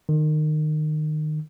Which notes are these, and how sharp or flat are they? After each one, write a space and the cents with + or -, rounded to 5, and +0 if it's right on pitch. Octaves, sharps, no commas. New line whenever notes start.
D#3 -25